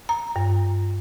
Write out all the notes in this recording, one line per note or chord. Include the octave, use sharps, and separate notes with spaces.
A#5
G2